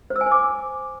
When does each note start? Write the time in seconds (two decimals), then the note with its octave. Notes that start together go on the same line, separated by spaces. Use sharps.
0.10 C5
0.16 E6
0.21 G#5
0.26 C5
0.32 D6